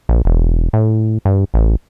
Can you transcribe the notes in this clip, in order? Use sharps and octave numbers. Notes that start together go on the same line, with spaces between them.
A#1
E1
A2
G2
A1